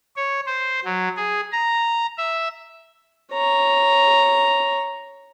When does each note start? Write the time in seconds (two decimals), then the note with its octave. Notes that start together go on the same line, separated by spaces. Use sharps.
0.16 C#5
0.46 C5
0.85 F#3
1.17 G#4
1.52 A#5
2.18 E5
3.33 C#5 A#5